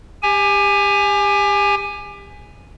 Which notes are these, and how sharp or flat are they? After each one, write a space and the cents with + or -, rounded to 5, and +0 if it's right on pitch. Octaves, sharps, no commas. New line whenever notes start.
G4 +30 G#5 +0